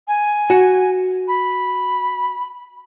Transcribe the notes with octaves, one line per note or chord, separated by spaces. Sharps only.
G#5
F#4 F#5
B5